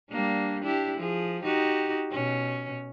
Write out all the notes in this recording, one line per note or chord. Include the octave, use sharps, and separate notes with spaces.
G3 A#3 D4
D4 E4 G4
F3 G#4
D#4 F#4 G4
B2 C#4